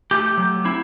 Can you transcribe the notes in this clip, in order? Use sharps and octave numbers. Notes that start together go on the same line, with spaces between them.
A3 G4
F#3
C4 E4